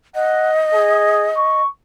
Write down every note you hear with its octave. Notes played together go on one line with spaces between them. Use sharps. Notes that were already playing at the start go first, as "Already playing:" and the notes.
D#5 F#5
G#4
C#6